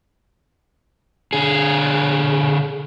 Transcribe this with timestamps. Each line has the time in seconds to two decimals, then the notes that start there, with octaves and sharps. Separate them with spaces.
1.33 D3 G#4